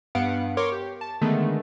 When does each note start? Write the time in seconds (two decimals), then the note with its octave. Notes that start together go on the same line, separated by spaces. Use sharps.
0.15 G2 B3 F5 F#5 C#7 D7
0.57 A#4 C#5 C6 D6
0.72 G4
1.01 A5
1.22 D3 D#3 G#3 A3 B3